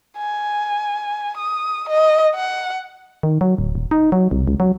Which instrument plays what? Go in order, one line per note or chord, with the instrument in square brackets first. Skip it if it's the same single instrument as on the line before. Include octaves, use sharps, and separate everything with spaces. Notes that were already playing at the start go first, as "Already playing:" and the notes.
[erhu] G#5
D#6
D#5
F#5
[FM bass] D#3
F#3
D1
D#1
D#4
F#3
C2
C#2
F#3